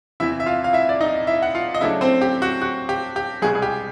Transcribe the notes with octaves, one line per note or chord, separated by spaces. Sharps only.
E2 C3 E3 E4 E5
E5
F4 F5
F5
E4 E5
D5
D#4 D#5
E4 E5
F#5
F4 F5
D#5
C#3 F#3 A3 D4 E4 E5
C4 C5
G4
F#4
F#4
G4
G4
C2 B2 G3 G#3 G#4
G#4
G4